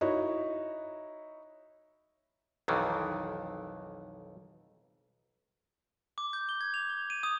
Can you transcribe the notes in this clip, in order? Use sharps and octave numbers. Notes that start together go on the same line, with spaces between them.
D#4 E4 F#4 C#5
B1 F2 D#3 E3
D6
G6
G7
G#6
F7
G7
D#7
D#6